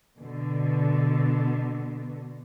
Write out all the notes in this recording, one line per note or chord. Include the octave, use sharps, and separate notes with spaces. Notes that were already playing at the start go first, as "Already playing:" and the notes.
B2 D3